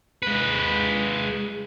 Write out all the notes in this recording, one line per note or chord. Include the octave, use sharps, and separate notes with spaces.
G#3 B4